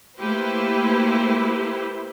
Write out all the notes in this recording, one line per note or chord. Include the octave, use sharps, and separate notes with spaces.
A3 A#3 E4 G4 B4 C5